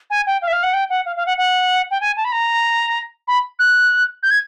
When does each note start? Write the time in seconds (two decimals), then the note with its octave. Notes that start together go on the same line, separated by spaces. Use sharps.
0.10 G#5
0.26 G5
0.42 F5
0.47 E5
0.52 F5
0.63 F#5
0.73 G5
0.90 F#5
1.06 F5
1.16 F5
1.26 F#5
1.38 F#5
1.91 G5
2.01 G#5
2.16 A5
2.24 B5
2.32 A#5
3.27 B5
3.59 F#6
4.23 G6
4.31 G#6